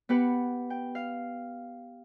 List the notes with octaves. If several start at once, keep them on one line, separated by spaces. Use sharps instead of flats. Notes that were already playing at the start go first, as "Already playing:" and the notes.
B3 G4 B4 F#5
G5
F5